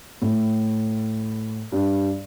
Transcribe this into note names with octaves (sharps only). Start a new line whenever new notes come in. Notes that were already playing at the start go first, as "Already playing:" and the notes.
A2
G2